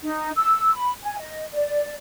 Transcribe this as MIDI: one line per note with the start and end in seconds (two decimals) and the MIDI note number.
0.04 0.30 63
0.35 0.75 88
0.75 0.93 83
1.03 1.19 80
1.19 1.45 75
1.54 1.96 74